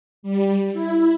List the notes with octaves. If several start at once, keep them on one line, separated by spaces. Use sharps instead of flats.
G3
E4